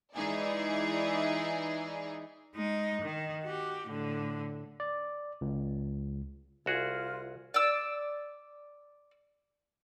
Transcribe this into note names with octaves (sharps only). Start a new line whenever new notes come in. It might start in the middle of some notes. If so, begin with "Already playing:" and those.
E3 G#3 D#4 E4 G#4 D5
G#3 D#4
D#3
F#4 G4
A2 D3
D5
C#2
C2 F4 F#4 G#4
D5 E6